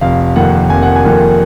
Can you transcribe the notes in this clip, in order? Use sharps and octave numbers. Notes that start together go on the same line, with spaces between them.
F1 F5
F2 D#3 A#3 F#5
F1 G#5
F#5
G#5
F2 D#3 A#3